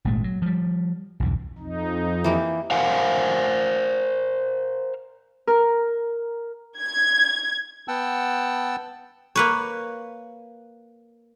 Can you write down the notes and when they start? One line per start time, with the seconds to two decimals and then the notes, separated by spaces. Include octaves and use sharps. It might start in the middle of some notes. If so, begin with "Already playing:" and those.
0.05 G#1 A#2 G#3 A3
0.24 F#3
0.42 F3 G3
1.20 B1 E2 G2
1.58 F2 D#4
2.24 E3 A#3 G4
2.71 A#4 C5 F5 F#5 G#5
5.47 A#4
6.80 G#6
7.88 B3 F#5 G5 A5 E6
9.36 A#3 B4 C#5